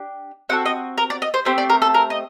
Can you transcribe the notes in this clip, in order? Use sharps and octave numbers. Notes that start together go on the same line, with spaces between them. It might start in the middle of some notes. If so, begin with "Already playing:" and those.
Already playing: D4 G4
C4 F#4 A4 F#5
D#5
A#4
D5
D#5
C5
A3 C4 G4 C5
D5
A#4
A4
A#4
D#5